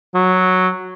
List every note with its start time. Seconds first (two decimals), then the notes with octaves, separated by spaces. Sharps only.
0.15 F#3